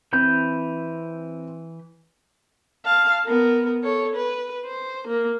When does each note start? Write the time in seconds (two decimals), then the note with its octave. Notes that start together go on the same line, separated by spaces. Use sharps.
0.13 E3 C4 B5 G6
2.85 F5 A5
3.26 B3 A#4
3.83 A4 C#5
4.16 B4
4.65 C5
5.08 A#3